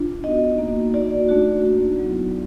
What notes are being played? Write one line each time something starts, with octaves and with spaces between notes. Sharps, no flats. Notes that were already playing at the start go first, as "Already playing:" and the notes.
Already playing: D4 F4
B3 D#4 F#4 D#5
A#3 D#4 F#4
A#3 D#4 F#4 D5
A3 D4 F#4
A#3 D#4 F#4
F#3 B3 E4